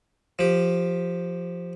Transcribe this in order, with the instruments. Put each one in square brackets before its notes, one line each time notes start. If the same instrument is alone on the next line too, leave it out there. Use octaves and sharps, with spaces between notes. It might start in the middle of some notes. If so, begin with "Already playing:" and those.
[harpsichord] F3 G4